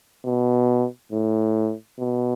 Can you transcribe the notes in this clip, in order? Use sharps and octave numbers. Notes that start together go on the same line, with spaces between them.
B2
A2
B2